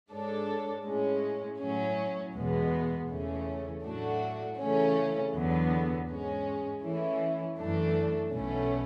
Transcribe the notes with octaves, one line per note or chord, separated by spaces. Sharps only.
G#2 G#3 D4 A4 C#5
A2 G#3 C#4
A2 F#3 C#4
E2 B2 G#3 B3
E2 C#3 E3 A3 C#4
A2 F#3 A3 D4 F#4
C#3 E3 A3 C#4
E2 D3 F#3 B3
G#2 G#3 C#4
E3 A3 C#4 E4
F#2 E3 A3 D4
B1 B2 A3 C#4